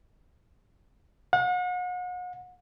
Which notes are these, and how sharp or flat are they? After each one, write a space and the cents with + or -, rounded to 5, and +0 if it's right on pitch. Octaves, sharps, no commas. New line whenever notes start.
F#5 -40